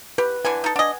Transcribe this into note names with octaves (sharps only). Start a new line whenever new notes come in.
G4 B4
D3 E3 B4 G#5
D#4 A4
D4 D#5 F#5 G#5